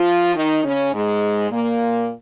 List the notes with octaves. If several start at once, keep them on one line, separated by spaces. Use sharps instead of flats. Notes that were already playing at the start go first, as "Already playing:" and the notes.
Already playing: F3 F4
D#3 D#4
C#3 C#4
G#2 G#3
A#2 A#3